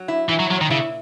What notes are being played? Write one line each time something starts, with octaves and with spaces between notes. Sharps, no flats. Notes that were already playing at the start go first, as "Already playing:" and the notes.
Already playing: F#3
E4
E3 E4
F#3
A#2 F#3
D#3
C#3 E4